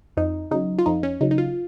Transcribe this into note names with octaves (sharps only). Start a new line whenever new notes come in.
F2 D#4
C#3 F#3 D#4
F4
F2 D#4
C#4
C#3 F#3 D#4
D#4
F4